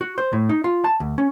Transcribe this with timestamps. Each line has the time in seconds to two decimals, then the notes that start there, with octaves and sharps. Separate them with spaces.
0.01 F#4
0.18 C5
0.33 A2
0.49 D#4
0.64 F4
0.84 A5
1.00 D2
1.18 C#4